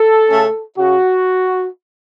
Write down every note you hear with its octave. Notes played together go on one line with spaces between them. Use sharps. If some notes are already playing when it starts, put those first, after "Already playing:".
Already playing: A4
C#3 A3 C#4
C#3 F#4